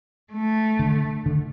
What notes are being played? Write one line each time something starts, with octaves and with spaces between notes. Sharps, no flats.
A3
D3
D3